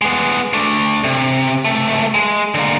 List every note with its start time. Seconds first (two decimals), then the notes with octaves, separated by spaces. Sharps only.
0.01 G#3 B3
0.53 A3 D4
1.04 C3
1.65 C#2 A3
2.14 G#3
2.54 D3 A#3